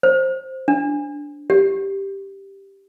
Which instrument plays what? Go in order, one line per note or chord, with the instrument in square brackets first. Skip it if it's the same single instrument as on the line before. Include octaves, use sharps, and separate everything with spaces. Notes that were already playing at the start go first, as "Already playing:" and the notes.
[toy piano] C5
D4
G4